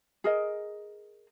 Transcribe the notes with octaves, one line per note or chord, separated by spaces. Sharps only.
G#4 A#4 D#5